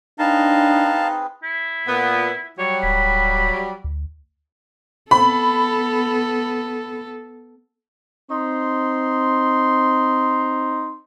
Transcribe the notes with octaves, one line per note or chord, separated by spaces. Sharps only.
C4 D4 D#4 G#4 B4 F5 A5
E4
A#2 B3
F#3 G3 C#5
D1 B5
D2
B3 A4 B5
C4 D#4 C6